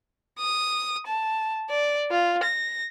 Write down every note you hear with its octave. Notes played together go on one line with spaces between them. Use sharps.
D#6
A5
D5
F4
A#6